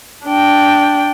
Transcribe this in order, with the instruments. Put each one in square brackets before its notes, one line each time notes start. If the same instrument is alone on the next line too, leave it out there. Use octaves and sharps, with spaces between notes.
[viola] D4 G5